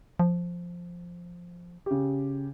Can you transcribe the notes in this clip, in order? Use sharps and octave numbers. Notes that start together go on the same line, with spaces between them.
F3
C#3 G4